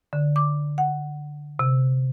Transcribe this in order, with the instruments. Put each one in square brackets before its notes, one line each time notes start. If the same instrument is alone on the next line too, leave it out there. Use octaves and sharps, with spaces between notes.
[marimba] D3
D6
F#5
C3